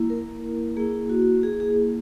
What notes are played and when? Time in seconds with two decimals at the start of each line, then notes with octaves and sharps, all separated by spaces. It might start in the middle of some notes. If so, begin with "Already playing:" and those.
Already playing: A#3 E4
0.10 A#4
0.77 A#3 E4 G#4
1.10 F#4
1.43 G#4
1.60 G#4